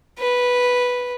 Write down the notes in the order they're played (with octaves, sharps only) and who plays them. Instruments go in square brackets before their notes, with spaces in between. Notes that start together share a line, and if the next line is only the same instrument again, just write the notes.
[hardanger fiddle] B4